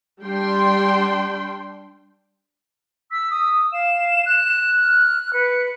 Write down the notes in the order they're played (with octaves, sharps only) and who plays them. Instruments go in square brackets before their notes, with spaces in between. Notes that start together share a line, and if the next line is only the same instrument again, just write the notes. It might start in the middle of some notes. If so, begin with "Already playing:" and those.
[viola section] G3 D4 G5 C6
[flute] E6 [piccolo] B6
[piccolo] D#6
[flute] F5 [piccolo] E7
[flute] F#6
[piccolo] F6
[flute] B4 [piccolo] C#7